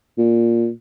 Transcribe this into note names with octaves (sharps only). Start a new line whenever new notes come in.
A#2